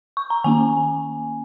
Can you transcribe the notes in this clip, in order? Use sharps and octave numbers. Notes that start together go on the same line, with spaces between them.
C#6
A#5
D#3 A#3 C#4 G#5